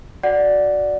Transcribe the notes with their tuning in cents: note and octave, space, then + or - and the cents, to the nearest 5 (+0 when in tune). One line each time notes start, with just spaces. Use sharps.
F#4 -15 D5 +0 F#5 -5